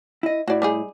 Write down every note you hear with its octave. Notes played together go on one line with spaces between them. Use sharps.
E4 D#5
A2 E4 F#4 D5
G3 D#4 G#4